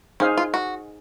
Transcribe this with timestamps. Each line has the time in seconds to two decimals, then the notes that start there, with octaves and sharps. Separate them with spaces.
0.20 C#4 D#4 G#4 C5 F5 G#5
0.38 F4
0.54 F#4